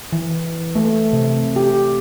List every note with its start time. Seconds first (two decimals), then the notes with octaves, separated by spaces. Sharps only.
0.12 E3
0.75 A3
1.13 C3
1.56 G4